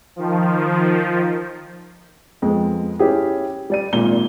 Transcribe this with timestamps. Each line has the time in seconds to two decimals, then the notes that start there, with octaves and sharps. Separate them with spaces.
0.16 D#3 F3
2.42 F2 G#3 B3
2.99 C#4 E4 G4 G#4
3.70 G3 D5 D#7
3.93 G#1 A#2 G7